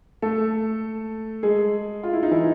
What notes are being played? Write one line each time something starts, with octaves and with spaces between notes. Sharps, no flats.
A3 A4
G#3 G#4
F4
E4
D#4
E3 E4